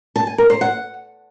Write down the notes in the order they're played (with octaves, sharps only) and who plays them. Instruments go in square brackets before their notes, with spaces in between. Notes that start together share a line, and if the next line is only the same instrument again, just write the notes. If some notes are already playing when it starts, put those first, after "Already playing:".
[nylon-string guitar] A5
G#5
A#4
C5
F#5